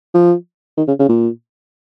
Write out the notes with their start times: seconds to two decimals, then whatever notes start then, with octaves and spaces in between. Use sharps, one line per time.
0.14 F3
0.77 D#3
0.88 C#3
0.99 C#3
1.09 A#2